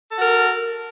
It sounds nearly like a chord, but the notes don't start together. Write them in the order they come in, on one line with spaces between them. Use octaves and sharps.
A4 F#4 A#4